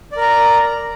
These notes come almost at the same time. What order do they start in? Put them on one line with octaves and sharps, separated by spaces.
D5 A#4 A#5